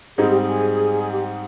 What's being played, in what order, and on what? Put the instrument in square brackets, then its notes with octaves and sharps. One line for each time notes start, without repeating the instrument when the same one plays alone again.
[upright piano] G#2 G3 C4 D#4 [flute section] G#4
[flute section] G4
G#4
G4